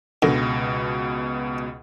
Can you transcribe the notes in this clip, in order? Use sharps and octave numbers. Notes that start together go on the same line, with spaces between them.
C#2 B2 D3 A#6